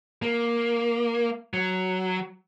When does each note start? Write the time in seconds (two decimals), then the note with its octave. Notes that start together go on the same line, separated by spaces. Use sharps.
0.22 A#3
1.54 F#3